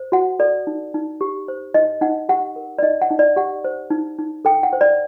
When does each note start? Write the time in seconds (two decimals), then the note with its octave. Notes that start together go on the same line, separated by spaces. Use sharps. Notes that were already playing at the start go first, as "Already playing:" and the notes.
Already playing: C5
0.12 F#4 F#5
0.39 A4 D5
0.67 D#4
0.94 D#4
1.21 G4
1.48 C5
1.74 D#4 D#5
2.01 D#4 F#5
2.29 G4 F#5
2.56 A#4
2.78 D5
2.82 D#4 D#5
3.02 F#5
3.11 D#4
3.19 D5
3.36 G4 F#5
3.64 C5
3.90 D#4
4.19 D#4
4.45 A4 G5
4.63 F#5
4.73 C5
4.81 D5